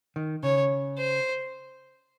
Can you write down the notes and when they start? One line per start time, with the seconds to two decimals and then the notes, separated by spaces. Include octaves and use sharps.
0.16 D#3
0.43 C#3 C#5
0.97 C5